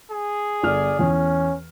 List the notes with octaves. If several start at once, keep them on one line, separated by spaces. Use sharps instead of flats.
G#4
G1 D5 F6
E2 C#4